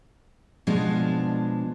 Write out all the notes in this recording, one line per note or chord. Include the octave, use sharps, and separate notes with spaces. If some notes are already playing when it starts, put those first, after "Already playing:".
B2 F3 G#3 D4